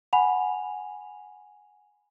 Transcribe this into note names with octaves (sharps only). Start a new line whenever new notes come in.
F#5 G#5 B5 F7